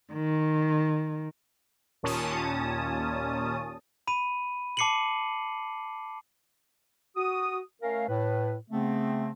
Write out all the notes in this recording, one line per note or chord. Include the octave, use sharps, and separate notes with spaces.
D#3
D#2 A#2 C#4 A5 D#6
B5 D#7
A5 D6 C7 C#7 D#7 F#7
F#4 D#6
A3 C#4 A#4 F5
A2 B4
C#3 A3 B3 C4